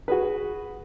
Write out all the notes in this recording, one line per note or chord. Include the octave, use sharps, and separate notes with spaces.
F#4 G#4 B4